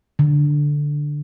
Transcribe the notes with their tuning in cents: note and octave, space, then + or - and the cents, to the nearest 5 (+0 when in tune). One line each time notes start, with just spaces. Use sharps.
D3 +0